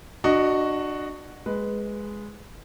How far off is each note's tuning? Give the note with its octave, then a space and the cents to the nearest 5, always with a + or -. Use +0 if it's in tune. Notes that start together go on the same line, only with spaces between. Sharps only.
D4 +25 F#4 +0 D#5 +0
G#3 +0 B4 +0